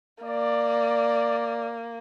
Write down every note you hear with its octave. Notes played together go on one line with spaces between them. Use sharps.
A#3 D5